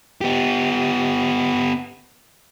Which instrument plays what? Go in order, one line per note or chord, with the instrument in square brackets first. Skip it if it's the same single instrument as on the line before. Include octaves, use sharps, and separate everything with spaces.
[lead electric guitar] B3 G4